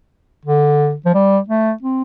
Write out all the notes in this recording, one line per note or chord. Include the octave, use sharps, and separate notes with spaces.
D3
F3
G3
A3
C4